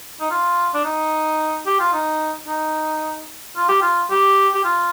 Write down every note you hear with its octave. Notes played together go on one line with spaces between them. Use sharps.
D#4
F4
D4
D#4
G4
F4
D#4
D#4
F4
G4
F4
G4
G4
F4